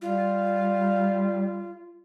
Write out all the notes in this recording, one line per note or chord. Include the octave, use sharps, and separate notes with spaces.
G3 F4